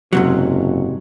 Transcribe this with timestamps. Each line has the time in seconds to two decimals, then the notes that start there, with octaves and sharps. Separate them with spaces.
0.13 F#1 G#2 C3 F#3